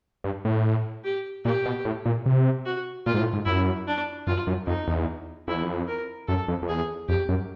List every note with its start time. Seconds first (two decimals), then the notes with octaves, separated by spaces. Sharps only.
0.24 G2
0.45 A2
1.04 G4
1.45 A#2 G4
1.66 B2
1.85 A2
2.06 A#2
2.26 C3
2.66 F#4
3.06 A#2 F4
3.14 G#2
3.20 A2
3.33 G#2
3.46 F#2 E4
3.87 D4
4.27 F#2 F4
4.47 F#2
4.67 F2 D#4
4.87 E2
5.48 F2 E4
5.55 E2
5.63 F2
5.88 A#4
6.28 F#2 A4
6.48 F2
6.62 F2
6.68 E2 G#4
7.09 F2 G4
7.29 F#2